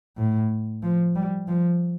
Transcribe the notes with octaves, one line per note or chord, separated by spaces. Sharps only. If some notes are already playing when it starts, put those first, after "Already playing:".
A2
F3
G3
F3